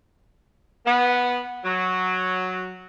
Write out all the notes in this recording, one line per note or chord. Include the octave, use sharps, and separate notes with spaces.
B3
F#3